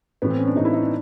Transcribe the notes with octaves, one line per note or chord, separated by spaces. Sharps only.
A2 E3 B3
C4
C#4
D4
A2 E3 D#4
E4
D#4
D4